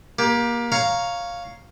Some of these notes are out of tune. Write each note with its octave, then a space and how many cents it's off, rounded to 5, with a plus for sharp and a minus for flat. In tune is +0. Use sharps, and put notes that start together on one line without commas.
A#3 +25 G4 +5
C#5 +0 F5 +0 A#5 +0